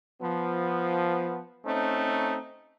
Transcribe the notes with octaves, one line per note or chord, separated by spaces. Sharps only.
F3 B3
A3 C4 C#4 D#4